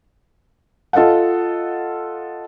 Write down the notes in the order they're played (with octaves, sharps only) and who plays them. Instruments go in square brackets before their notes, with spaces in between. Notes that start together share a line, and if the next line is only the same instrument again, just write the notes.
[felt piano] F4 A4 D#5 F5 F#5